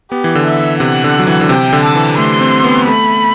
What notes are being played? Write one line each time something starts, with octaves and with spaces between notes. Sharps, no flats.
B3 G4
E3
D3
E5
C3 F#5
D3
F#3
E3
D3
C3 G5
D3
A5
E3
A3 C6
C4
B3
A3 B5